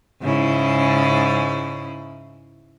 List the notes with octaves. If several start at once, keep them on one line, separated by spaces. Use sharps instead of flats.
G#2 C#3 E4